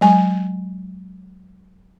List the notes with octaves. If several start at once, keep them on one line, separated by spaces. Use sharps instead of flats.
F#3 G#3 G#5